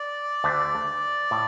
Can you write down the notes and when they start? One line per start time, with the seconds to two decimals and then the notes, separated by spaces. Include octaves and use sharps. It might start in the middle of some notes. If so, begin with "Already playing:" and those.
Already playing: D5
0.44 D2 D3 A3
1.31 A2